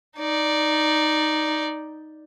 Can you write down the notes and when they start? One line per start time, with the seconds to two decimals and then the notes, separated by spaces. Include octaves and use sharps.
0.18 D#4 D5